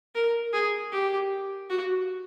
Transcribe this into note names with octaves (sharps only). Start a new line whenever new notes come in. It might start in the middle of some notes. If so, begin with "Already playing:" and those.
A#4
G#4
G4
F#4